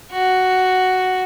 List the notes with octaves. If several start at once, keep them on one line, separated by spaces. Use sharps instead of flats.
F#4